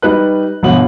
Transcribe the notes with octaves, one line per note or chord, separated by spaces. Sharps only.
G3 D#4 B4 F#6
G1 B2 F#5 F#7